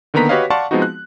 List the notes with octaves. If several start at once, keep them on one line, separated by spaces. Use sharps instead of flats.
D3 D#3 A#3 B3 A#5 B6
F#4 G4 B4 C#5 D#5 F5
D5 F5 F#5 A5 C6 C#6
F3 G#3 B3 C4 D#4 F#4
F#6